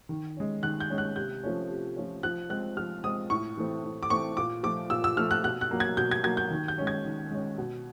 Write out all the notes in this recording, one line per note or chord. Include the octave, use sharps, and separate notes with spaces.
D#3
G#3 C#4
D#3 F#6
G6
G#3 C#4
F#6
C3 G6
F3 A3 C#4
C3
F3 A3 C#4
F3 F#6
G#3 C4 F#6
F3 F6
G#3 C4 D#6
A2 C#6
E3 A3 C4
A2
D6
E3 A3 C4 C#6
A#2 D6
F3 A3 D6
A#2 E6
E6
F3 A3 F6
F#6
B2 F#6
F#6
F#3 A#3
G#6
B2 G6
G#6
F#3 A#3 G#6
G6
D#3
G6
G#3 C#4
G#6
D#3
G#3 C#4
B2